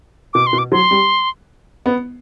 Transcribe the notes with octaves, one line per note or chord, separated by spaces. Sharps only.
B2 D6
C6
B2
D6
F#3 C6
G3
B3